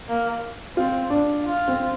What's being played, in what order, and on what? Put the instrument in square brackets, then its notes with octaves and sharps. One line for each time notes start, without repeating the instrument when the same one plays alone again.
[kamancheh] A#3
[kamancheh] C4 [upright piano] F4
[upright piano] D4
[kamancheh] F4
[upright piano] C4